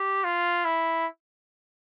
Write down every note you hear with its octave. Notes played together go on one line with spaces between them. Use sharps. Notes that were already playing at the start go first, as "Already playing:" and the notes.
Already playing: G4
F4
E4